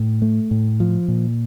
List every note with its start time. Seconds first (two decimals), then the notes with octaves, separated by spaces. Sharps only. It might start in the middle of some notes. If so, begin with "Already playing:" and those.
Already playing: A2
0.22 A3
0.51 A2
0.80 F3
1.08 A#2